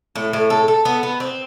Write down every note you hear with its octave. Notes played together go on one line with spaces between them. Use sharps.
A2
A2
A4
A4
B3
B3
C4